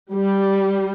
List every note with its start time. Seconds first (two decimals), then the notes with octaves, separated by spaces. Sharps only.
0.12 G3